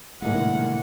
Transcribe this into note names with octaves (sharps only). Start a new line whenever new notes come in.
A#1 A2 C3 D#3 G#3 F#5